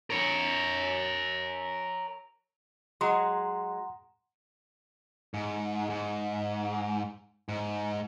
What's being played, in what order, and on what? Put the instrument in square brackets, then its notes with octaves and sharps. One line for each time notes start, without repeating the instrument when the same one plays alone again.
[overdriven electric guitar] A#4 C#5
[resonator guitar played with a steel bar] F#3 G#3 [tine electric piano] F#5 A#5 C6
[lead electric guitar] G#2
G#2
G#2